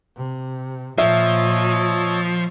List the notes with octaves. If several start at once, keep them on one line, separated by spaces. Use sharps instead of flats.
C3
A#2 F3 C#5 D#5 E5 E6